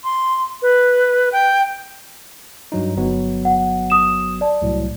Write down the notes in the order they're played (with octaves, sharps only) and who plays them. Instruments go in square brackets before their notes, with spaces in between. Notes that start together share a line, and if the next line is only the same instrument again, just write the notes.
[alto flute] C6
B4
G5
[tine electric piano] G2 F#3 D#4
G1 F#3 B3
[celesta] F#5
D#6 E7
D5 A5
[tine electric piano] C2 A2 F#3